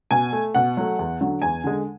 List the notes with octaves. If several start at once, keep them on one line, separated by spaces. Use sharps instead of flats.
B2 G#5
A3
B2 F#5
F#3 A3
E2
D3 F#3
E2 G#5
D3 G#3